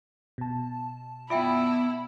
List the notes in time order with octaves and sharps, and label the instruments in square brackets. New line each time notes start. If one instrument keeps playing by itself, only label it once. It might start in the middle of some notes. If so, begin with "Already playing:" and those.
[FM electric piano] B2 A5
[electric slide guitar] B3 D5 [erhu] E4 [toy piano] F4 E5 G5